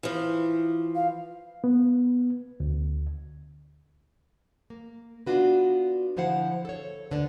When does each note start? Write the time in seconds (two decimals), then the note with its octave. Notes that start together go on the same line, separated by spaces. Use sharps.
0.03 E3 F3
0.95 F5
1.64 B3
2.60 D2
4.70 A#3
5.26 B3 D4 F4 F#4 B4
6.17 D3 F3 E4 C5 F5 F#5
6.65 A4 C#5
7.11 D2 D3 B4 D5